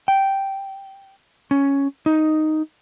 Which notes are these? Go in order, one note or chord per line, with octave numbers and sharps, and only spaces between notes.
G5
C#4
D#4